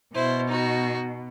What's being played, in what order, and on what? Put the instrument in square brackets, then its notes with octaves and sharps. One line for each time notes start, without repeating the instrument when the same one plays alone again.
[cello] B2 [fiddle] E4 C5
[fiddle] D#4 F#4